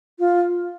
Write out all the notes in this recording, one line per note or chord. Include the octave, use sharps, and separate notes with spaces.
F4